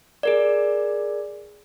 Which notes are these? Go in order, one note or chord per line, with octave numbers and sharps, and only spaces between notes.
G#4 A#4 D5